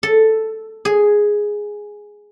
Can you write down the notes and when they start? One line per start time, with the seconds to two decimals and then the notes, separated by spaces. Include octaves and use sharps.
0.03 A4
0.85 G#4